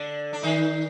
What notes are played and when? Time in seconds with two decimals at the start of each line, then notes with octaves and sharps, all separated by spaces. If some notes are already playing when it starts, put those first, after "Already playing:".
Already playing: D3 D4
0.33 D4
0.43 D#3 D#4